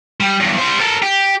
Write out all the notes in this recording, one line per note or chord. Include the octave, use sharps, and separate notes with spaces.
G3
E2 G2
G3 C5
A4 A#4
G4